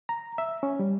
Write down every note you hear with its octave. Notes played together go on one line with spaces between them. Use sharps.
A#5
E5
C#4
G3